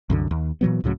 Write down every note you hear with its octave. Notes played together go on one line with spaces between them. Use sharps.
C2 F#2 D3
D#2
A#2 E3 F#3 B3
C#2 A2 C#3 F#3